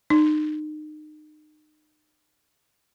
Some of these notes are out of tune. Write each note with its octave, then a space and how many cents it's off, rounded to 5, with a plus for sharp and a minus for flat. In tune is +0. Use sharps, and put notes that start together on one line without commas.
D#4 -30